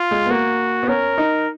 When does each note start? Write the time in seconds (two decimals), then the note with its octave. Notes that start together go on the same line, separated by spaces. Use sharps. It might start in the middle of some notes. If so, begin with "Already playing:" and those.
Already playing: F4
0.11 G#3
0.26 B3
0.31 A#3 F#4
0.83 B3
0.88 C#4 A#4
1.18 D#4